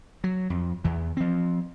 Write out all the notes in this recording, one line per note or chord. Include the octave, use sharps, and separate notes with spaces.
F#3
F2
E2 E3
F3 C4